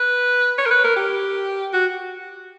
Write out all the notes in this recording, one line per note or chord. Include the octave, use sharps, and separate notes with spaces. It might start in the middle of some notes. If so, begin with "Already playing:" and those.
Already playing: B4
C#5
A#4
B4
A#4
G4
F#4